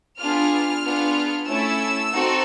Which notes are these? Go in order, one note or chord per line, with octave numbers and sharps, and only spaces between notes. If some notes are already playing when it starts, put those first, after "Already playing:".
B3 D4 F4 G#4 F6
B3 D4 F4 G#4
A3 C#4 E4 A4 E6
C4 D#4 F#4 A4